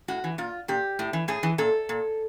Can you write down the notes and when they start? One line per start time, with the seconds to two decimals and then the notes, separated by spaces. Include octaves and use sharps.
0.08 A2 F#4
0.24 E3
0.38 A#2 F4
0.68 A#2 G4
0.99 A2
1.13 E3
1.28 A2 G#4
1.43 E3
1.58 A#2 A4
1.89 A#2